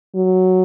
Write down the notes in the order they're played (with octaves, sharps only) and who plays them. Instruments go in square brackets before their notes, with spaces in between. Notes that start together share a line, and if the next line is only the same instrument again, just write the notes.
[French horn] F#3